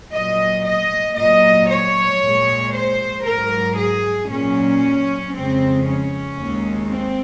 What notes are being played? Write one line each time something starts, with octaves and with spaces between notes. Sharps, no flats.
A#2 F#3 D#5
D#5
A#2 F#3 D#5
C#5
A#2 G#3
C5
G#2 F#3 A#4
G#4
A#2 F#3 C#4
F2 C#3 G#3 C4
C#4
D#2 D#3 G#3
C4